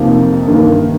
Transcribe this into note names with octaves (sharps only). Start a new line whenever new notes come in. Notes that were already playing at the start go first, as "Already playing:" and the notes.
Already playing: F2 C3 F3 A#3 D#4
G2 D#3 A#3 D#4